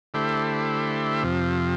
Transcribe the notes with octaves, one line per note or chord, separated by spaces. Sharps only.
D3 A3 E4 G4 C5
F2 C3 F3